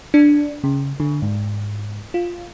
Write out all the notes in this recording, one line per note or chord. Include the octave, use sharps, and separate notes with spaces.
D4
C#3
D3
G#2
F4